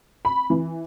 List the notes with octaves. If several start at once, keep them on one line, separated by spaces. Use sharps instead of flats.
B5
E3